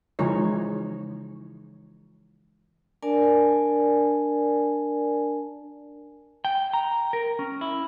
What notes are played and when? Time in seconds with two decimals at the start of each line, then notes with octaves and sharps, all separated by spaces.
0.19 C#3 E3 F3 G#3 D#4 C#5
3.03 D4 A#4 D5 G#5 A5
6.45 G5
6.74 A#5
7.13 A#4
7.39 C#4
7.61 E4